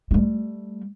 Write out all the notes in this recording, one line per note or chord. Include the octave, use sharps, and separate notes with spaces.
G3 A3